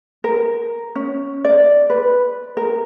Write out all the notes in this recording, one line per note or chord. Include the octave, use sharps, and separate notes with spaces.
A#4
C#4
D5
B4
A#4